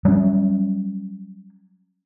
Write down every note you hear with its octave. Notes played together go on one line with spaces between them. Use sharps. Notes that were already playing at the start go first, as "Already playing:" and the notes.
F#3 G3 A#3 C#4